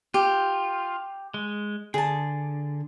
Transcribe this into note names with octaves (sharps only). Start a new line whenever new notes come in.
F4 G4
G#3
D3 G#4 A5